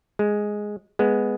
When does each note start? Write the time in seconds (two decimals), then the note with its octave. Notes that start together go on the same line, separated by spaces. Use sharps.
0.19 G#3
0.99 G#3 B3